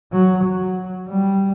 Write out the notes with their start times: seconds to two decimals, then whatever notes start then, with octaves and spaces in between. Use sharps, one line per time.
0.12 F#3
0.44 F#3
1.09 G3